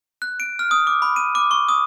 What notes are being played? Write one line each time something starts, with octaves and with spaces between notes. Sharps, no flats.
F#6
D7
F6
D#6
D6
B5
D#7
D6
C#6
D#6